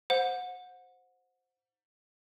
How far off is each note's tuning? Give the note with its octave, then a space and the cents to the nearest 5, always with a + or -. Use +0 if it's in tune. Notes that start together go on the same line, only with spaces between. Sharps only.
C5 +0 F#5 -25